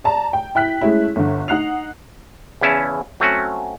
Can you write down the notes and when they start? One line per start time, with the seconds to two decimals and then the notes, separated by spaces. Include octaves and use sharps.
0.04 D5 A5 A#5
0.33 G5
0.55 E4 G5 F#6 B6
0.81 G#3 A3 C#4 E4
1.16 G1 D3
1.48 D#4 F#5 F#6 C7 F7
2.61 E2 C#3 C#4 E4 A5
3.20 F#3 A3 C4 C#4 F#4